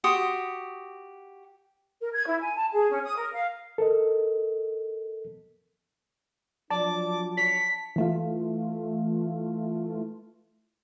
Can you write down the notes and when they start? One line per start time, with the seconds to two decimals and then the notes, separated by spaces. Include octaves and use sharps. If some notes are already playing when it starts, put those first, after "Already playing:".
0.04 F#4 G4 C6 D#6
2.01 A#4
2.13 G#6
2.27 E4
2.41 G#5
2.55 A5
2.72 G#4
2.90 C#4
3.04 D#6
3.17 A#4
3.33 F5
3.78 A4 A#4 D#5
6.70 F3 F#3 D4 D5 A5 D6
7.37 C#5 B6
7.96 E3 A3 F4